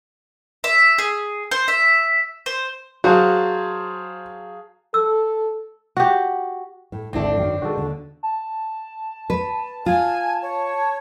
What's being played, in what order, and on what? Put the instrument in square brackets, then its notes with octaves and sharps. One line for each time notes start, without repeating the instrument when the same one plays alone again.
[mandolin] E5
G#4
C5
E5
C5
[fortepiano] F#3 [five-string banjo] F#4 [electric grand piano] G#4 F5 A5 [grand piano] C5
[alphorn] A4 [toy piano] E6
[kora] F#4 G4
[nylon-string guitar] A2
[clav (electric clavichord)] G#1 A3 [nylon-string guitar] D2 E4 A4 [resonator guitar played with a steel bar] C4 D4
[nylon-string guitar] F#2 D#3 F#3
[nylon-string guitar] D#3 G#3 [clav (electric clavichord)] F#4 A4
[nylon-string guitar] D#2 D3
[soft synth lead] A5
[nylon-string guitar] B4
[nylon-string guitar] F4 [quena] G#5
[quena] C#5